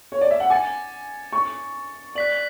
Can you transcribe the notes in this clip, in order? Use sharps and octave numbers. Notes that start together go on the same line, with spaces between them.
C#5
D5
E5
F#5
G#5 D6 A6 C#7
C#6
D5 F#6 B6 F#7